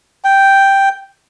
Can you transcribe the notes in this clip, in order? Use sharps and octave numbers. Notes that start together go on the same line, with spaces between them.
G5